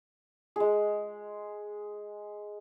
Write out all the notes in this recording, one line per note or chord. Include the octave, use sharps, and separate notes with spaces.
G#3 G#4